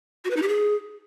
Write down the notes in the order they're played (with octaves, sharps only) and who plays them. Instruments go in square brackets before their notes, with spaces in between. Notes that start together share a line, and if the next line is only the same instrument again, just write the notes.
[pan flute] F#4
B4
D#4
G4
G#4